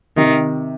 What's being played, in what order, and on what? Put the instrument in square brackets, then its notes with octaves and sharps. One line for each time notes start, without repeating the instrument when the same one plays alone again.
[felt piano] C3 [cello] D#3